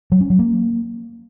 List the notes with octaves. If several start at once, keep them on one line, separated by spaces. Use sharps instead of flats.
F#3
C#4
F#3
A#3